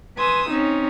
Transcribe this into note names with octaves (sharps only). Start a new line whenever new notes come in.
B4 G#5 C6 D#6 E6
C4 C#4 D#4